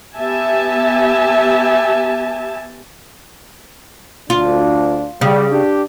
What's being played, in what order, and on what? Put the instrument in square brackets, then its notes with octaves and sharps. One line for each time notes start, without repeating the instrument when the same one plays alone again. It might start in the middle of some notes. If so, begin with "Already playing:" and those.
[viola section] B3 G4 E5 G#5 A5
[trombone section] D2 D4 [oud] F4
[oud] C#3 [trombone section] G3
[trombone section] D4 G4